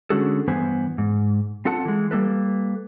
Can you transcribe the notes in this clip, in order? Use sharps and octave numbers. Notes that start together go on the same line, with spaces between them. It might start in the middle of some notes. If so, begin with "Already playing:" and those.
D3 G#3 C#4 F#4 G#4 A4
G2 E3 B3 B4 C5 G#5
G#2
C4 F4 A4 F#5 A5
E3 G#3
G3 A#3 A4 B4